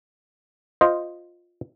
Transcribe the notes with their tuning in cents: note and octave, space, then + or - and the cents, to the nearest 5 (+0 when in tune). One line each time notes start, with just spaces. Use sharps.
F4 +10 C5 +0 D#5 +0